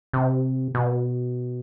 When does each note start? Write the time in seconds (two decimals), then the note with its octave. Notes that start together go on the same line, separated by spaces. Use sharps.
0.13 C3
0.75 B2